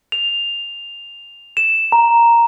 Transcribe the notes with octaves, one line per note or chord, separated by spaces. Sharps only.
F7
E7
A#5